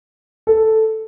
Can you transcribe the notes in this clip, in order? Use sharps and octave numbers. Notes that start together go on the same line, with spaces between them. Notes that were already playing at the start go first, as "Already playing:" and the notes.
A4